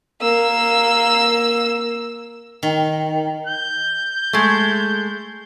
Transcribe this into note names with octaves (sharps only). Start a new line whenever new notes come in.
A#3 E6
D#3
G6
G#3 A3